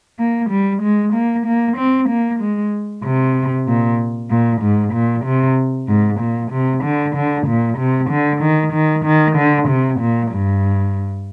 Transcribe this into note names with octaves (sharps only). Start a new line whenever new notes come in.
A#3
G3
G#3
A#3
A#3
C4
A#3
G#3
C3
A#2
A#2
G#2
A#2
C3
G#2
A#2
C3
D3
D3
A#2
C3
D3
D#3
D#3
D#3
D3
C3
A#2
G2